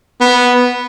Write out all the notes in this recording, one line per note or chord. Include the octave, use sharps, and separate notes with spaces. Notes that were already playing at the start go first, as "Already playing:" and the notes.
B3